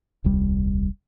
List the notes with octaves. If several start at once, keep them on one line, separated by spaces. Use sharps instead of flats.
D#1 C2 G3